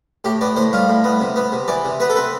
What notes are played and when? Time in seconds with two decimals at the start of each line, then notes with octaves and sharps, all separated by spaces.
0.24 A2 G4
0.41 B3 D5
0.56 A2 C5
0.73 G3 F4
0.89 A2
1.04 B3
1.20 C3
1.36 B3
1.52 C3
1.68 E3 D5
1.85 C3
2.00 B3 B4
2.10 A4
2.16 C4 B4